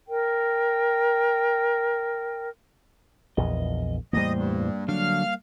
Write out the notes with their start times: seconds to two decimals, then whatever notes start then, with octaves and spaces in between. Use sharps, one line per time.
0.07 A#4 G5
3.37 A#1 E2 D#5
4.13 E2 A2 G3 A#3 C5 D#5
4.36 G2
4.88 D3 F#3 D4 F5 F6